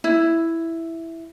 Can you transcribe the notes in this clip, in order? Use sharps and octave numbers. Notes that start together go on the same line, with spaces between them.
E4